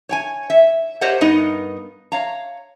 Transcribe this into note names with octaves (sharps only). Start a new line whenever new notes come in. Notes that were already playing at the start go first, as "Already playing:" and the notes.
C#5 G5 G#5
E5
G4 A#4 C5 C#5 D#5 F#5
G2 B3 D#4 A#4 D#5
C#5 F5 A#5